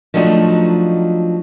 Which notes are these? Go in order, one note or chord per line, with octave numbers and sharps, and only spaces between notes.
F3 F#3 A3 D4 D#4 F#4